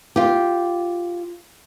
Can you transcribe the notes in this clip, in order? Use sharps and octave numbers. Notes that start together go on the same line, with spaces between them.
F4 G4